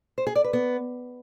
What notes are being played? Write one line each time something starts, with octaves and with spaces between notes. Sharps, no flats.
C5
G#4
D5
B4
B3